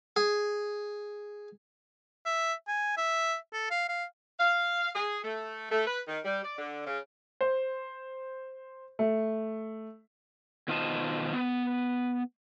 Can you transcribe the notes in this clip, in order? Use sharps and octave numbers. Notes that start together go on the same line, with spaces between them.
G#4
E5
G#5
E5
A4
F5
F5
F5
G#4
A3
A3
B4
D#3
G3
D5
D3
C#3
C5
A3
B2 D#3 F4 C5 D#5 A5
B3